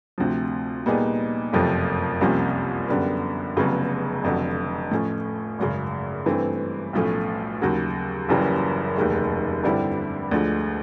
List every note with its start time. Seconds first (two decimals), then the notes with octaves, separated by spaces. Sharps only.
0.18 D2 C3 F3
0.86 A#2 G3 B3 D#4 G#4
1.53 F#1 F2 C3 F3 A3
2.21 C2 C3 F3 A#3 C#4
2.88 F#2 D3 G3 B3
3.56 F1 F2 C#3 F#3 B3
4.23 F1 F2 D3 F#3
4.91 A2 F3 A3 C#4
5.59 G#1 F#2 C#3
6.26 G2 E3 A3 C4
6.93 B1 A2 F3 A3 C#4
7.61 D#2 C#3 F#3
8.29 F#1 F#2 C#3 E3 G3
8.96 F1 D#2 D#3 G#3
9.64 G2 D3 G3 C4 E4
10.31 D2 D3 F3 G#3